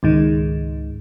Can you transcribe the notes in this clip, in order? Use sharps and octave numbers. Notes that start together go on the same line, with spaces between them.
C#2 G#2 D#3